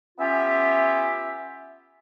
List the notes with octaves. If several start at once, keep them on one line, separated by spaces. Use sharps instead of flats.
B3 C#4 F4 G4 E5